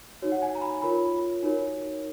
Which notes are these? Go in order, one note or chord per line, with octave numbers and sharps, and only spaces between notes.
D#4 F#4 C#5
F#5
G#5
A#5
B5
F4 A#4 C#5 B5
D#4 F#4 A#4 C#5